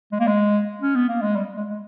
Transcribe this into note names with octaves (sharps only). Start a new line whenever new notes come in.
G#3
A#3
G#3
C#4
B3
A#3
G#3
G3
G#3
G#3